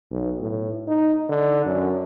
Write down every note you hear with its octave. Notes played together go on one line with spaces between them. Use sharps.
B1
A2
D#4
D3
F#2